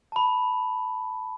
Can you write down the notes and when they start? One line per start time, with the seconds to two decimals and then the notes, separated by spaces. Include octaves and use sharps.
0.12 A5 B5